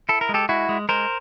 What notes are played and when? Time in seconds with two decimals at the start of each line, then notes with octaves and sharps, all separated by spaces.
0.09 E4 A4
0.21 A#4
0.29 G#3
0.34 G4 A4
0.49 G#3 E4 F#4
0.69 G#3
0.89 G#3 A#4 C5